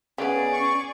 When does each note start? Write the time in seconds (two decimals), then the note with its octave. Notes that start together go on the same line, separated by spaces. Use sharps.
0.18 C#3 G3 B3 C#4 G#4 D5
0.53 C#6